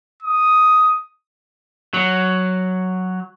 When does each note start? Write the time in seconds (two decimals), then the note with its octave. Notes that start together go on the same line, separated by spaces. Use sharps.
0.23 D#6
1.94 F#3